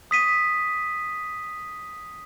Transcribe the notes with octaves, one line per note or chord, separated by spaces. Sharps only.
D#6 B6 D#7